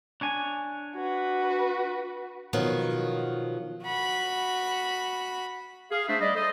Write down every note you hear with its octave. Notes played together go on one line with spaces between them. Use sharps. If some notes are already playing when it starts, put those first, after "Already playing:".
D4 C#5 G#5
F#4 B4
B2 D#3 F3 F#3
F#4 B5
G#4 F5
A3 D4 G#4 C5 E5
G3 D5 D#5
A4 C5 D#5